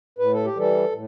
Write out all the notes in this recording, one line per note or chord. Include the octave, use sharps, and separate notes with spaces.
A2 B4
A4
G4
E3 G3 A4
A2